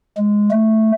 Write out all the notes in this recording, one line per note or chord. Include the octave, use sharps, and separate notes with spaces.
G#3
A3